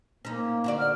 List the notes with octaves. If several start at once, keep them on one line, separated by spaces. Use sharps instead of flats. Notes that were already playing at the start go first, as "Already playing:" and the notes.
A#3 C#4 D#4
D3 F#4 D5
F6